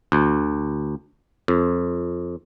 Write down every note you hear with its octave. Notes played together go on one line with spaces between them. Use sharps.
D2
F2